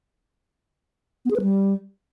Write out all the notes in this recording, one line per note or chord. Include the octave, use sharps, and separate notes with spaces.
B3
G#4
B4
G3